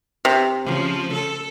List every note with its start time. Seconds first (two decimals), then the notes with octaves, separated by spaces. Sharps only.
0.25 C3
0.65 C#3 F3
1.13 A4